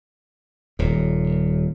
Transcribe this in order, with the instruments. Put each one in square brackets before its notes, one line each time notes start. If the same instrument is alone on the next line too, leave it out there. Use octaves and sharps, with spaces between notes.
[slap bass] D#1 A#2